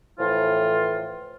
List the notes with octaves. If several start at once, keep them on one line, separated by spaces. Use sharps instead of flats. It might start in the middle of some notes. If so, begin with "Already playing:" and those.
A2 E3 F3 F4